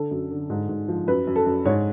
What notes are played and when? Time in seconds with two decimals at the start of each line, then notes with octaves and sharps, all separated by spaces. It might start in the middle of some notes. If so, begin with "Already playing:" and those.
Already playing: D3 A4
0.11 F#2
0.31 D3
0.50 G#2
0.69 G#2
0.88 F3
1.07 F#2 B4
1.27 F#2
1.36 A4
1.46 F#2
1.65 G#2 C#5